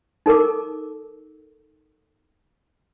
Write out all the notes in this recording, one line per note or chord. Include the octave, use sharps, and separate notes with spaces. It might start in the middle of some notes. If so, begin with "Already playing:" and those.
D#4 A4 A#4 D6